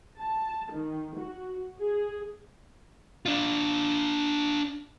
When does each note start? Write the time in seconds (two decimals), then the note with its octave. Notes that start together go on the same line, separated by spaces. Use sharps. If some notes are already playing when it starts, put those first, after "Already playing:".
0.18 A5
0.72 D#3
1.17 F#4
1.79 G#4
3.26 D4 F4